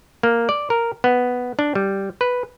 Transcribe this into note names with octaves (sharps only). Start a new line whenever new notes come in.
A#3
D5
A#4
B3
D4
G3
B4